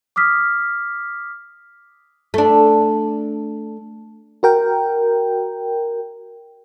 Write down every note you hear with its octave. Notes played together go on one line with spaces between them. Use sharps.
D6 D#6 F6 B6
A3 D4
F#4 A#4 G5